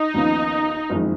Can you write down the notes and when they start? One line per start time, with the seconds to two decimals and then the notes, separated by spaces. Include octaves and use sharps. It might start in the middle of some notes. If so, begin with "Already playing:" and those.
Already playing: D#4
0.14 D#2 C#3 F3 B3
0.90 F#1 F2 D#3 G#3